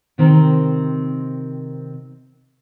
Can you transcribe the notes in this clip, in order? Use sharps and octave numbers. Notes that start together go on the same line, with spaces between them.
C3 D#3 C4 A#4